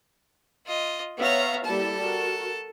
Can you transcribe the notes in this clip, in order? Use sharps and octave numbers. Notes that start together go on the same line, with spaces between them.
F4 D#5
B3 C#5 E5 F5 A#5
G3 A#3 E4 A4 A5
F#4 A#4